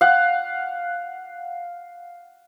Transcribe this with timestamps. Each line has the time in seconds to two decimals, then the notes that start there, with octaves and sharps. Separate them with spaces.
0.01 F5 F#5